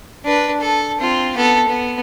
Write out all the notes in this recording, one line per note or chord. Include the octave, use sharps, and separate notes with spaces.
D4 B4
A4
C4 F4
B3 A4
B3